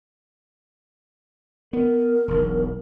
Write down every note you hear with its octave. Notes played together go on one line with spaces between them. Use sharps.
B3 A#4
E1 B1